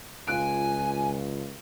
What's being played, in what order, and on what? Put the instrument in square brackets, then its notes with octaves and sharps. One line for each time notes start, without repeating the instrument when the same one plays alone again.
[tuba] C#2 [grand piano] F4 F#6 D7 [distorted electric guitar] G#5